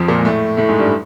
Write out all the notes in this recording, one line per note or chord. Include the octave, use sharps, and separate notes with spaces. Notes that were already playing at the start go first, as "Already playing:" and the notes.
Already playing: F2 F3
A#2 A#3
G#3
A2 A3
A2 A3
G#2 G#3
G2 G3